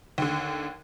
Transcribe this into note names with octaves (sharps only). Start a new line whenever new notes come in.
D#2 D3